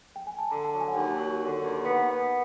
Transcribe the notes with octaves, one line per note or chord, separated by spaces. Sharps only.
G5
G#5
A5
D3 A#5
A5
F#3
G#5
F#5
D#2 G5
F#3
D3
D#2
B3 F#5
B3